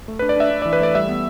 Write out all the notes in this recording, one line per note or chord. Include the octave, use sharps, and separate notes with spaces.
A3
D4 B4
D5
D4 E5
D4
E3 D5
B4
A3 D5
G3 E5
B3